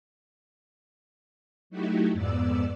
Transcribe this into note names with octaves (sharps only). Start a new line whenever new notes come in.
F#3 A3 D#4 E4 F#4 G4
F2 G#2 B3 D5 E6